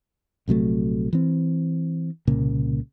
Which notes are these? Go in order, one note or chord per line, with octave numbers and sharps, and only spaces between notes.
A#1 C3 F#3 A3
E3 C4
C2 A#2 C#3 A#3